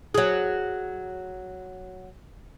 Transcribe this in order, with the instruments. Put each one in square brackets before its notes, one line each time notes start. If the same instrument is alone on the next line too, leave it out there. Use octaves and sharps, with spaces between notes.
[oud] F#3 G#4